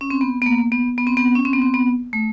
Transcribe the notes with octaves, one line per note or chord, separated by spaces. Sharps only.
C#4
C4
B3
B3
A#3
B3
B3
C4
B3
C#4
C4
B3
C4
B3
A3